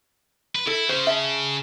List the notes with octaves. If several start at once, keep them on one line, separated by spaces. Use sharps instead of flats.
B4
E4 A4
C#3 C5
E5 A5